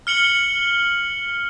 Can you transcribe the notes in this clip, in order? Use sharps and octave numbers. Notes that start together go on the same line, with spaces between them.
F6 C#7 F#7 G7